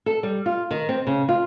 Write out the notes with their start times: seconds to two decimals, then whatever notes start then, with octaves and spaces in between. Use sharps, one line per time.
0.06 A4
0.23 G3
0.46 F4
0.71 D#3
0.89 C4
1.07 C#3
1.29 F4